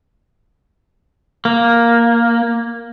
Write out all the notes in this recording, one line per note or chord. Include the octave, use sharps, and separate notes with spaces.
A#3